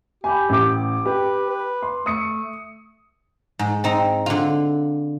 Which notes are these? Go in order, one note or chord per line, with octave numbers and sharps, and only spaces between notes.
G4 G#5 B5
A1 D6
G4 B4
B4
C6
A3 D#6 C#7
G#2
C4 D#4
D3 F4